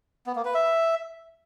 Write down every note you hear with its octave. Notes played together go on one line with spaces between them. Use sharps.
B3
A#3
B4
E5